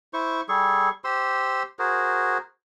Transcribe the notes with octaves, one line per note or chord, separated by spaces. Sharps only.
E4 C5 C#6
G3 G#4 A4 C#6
G4 C5 C6 E6
F#4 G#4 A#4 C5